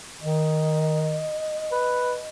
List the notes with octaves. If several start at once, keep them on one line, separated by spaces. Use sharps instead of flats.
D#3 D#5
B4